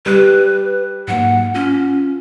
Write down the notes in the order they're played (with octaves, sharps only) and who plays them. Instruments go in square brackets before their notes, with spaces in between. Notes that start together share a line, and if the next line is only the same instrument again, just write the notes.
[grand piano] G3 [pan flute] B4
[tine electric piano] G#2 F#3 A#3 [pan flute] F#5
[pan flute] C#4 [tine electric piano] F4